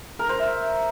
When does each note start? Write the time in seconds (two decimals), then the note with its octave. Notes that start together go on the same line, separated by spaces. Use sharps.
0.19 A#4
0.29 C5
0.39 E5